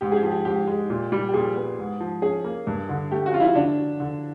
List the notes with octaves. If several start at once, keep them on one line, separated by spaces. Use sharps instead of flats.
G#2 G4
G#4
G4
F3
G4
G#2 G4
G#3
A#2
G3
G4
A#2 G#4
B3
G#2
F3
C#4 G#4
A#3
G2
D3
A3 G4
F#4
F#3 F4
E4
D3 D4
F#3
D3